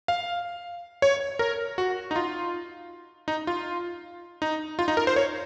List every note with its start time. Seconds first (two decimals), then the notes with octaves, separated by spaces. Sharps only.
0.08 F5
1.02 C#5
1.39 A#4
1.78 F#4
2.11 D#4
2.16 F4
3.28 D#4
3.47 F4
4.42 D#4
4.79 F4
4.88 D#4
4.97 A#4
5.07 C5
5.16 C#5